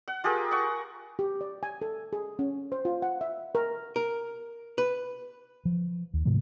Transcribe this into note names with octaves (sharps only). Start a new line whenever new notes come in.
F#5
F4 G4 G#4 A#4
F#5 C#6
G4
D5
G#5
A4
G#4
C#4
C5
F4
F#5
E5
A#4
A#4
B4
F3
D#2
G#2 C3 F3 A3